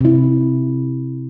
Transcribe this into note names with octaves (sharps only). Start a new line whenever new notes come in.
C3 E4